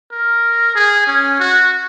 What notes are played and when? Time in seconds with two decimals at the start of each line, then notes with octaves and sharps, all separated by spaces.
0.12 A#4
0.75 G#4
1.07 C#4
1.40 F#4